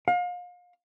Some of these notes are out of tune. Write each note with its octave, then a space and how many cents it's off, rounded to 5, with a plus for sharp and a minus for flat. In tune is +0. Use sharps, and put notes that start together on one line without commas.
F5 +35